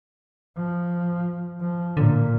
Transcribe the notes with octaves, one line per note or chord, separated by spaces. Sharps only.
F3
F3
A#2 D3